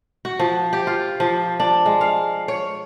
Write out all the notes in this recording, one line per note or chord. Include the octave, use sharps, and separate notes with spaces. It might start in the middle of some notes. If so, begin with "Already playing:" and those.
F#4
F3
G4
F4
F3
D4
G#3
F5
C#5